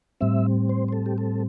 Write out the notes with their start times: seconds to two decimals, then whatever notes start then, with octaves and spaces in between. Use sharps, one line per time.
0.21 A2 G3 C4 E5
0.69 C5
0.88 C5
0.92 A4
1.06 G4
1.18 A4